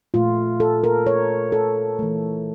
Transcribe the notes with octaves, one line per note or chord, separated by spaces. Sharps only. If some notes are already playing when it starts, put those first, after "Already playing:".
A#2 A3 F4
A4
A#4
C#5
A4
E3 A3